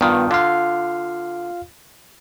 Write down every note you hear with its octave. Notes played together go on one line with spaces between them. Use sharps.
G2 D#3 B3 F4
D3 F4 F5